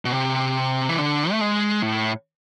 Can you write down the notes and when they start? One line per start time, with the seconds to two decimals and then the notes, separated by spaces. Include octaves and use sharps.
0.05 B2
0.12 C3
0.89 E3
0.98 D3
1.31 A3
1.41 G#3
1.82 A2